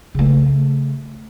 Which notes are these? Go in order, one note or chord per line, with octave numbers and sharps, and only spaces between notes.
C#3 A3